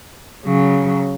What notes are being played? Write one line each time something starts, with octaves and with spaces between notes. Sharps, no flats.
C#3 F#3